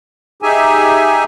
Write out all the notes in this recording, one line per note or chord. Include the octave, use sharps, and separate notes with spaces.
D#4 G4 G#4 E5 G#5